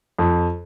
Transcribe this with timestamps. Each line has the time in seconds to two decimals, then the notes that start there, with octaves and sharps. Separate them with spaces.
0.19 F2